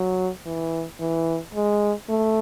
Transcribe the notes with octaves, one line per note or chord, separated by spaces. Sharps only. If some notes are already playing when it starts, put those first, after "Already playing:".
Already playing: F#3
E3
E3
G#3
A3